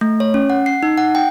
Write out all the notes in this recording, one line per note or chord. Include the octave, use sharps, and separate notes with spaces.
A3
C#5
C#4
F#5
C7
D#4
F#5
G5